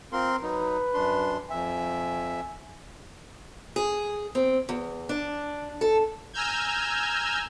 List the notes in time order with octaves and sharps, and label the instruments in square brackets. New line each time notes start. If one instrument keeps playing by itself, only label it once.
[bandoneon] C4 A#4 C6 [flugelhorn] F4
[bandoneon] F#3 D#4 [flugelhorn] B4
[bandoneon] F#2 D4 C6
[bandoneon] F2 E5 [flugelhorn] G#5
[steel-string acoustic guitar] G#4
C4
E2
D4
A4
[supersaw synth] G#5 A#5 E6 F6 G6 G#6